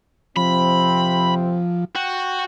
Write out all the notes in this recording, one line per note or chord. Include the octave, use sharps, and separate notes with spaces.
F2 C3 F3 C4 B5
F#4 G5